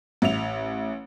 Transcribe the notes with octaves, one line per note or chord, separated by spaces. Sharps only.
A1 E5 F7